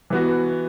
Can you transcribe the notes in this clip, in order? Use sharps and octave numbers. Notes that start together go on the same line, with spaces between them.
E3 B3 F#4